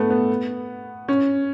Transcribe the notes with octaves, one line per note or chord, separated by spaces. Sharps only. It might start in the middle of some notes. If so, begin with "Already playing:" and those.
Already playing: A3 B3
B3
C#4